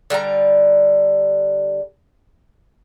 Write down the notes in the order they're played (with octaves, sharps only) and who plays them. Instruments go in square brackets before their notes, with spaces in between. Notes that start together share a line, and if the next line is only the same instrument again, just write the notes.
[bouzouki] D3 G3 E5 A#5